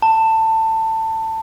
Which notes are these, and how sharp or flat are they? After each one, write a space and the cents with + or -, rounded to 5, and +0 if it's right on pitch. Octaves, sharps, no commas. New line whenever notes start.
A5 +20